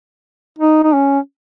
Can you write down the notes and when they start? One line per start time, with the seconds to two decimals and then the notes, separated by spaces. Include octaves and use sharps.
0.59 D#4
0.84 D#4
0.94 C#4